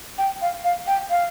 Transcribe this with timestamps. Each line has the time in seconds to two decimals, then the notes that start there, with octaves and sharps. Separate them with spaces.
0.18 G5
0.42 F5
0.64 F5
0.87 G5
1.10 F5